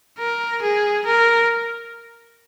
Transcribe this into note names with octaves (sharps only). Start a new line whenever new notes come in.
A#4
G#4
A#4